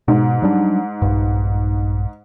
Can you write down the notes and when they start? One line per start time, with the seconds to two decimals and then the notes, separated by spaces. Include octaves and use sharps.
0.08 G#2 B2
0.42 F#3 G3 D4
1.02 A#1 G2